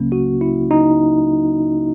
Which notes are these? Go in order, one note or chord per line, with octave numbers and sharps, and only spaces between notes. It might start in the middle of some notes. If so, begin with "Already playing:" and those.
Already playing: C#2 C#3 F#3 A#3 C#4
F#4
E4
D#4